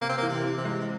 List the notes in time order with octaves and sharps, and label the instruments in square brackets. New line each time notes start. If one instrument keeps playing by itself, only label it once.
[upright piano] C3 [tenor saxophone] A#3
[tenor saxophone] C4
[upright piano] E3 [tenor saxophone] A#3
[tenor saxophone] C3
[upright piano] E3
[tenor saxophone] C3
[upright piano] G#3
[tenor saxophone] C3